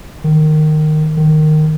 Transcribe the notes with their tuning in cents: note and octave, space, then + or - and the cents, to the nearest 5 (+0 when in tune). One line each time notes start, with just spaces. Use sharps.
D#3 -15
D#3 -15